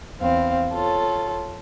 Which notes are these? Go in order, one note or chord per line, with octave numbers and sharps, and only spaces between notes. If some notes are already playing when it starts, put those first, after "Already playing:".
E2 C4 F5
F4 A4 C#5